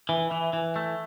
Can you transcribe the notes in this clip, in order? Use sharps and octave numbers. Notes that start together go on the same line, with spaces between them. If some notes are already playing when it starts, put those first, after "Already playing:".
E3
E3
E3
A3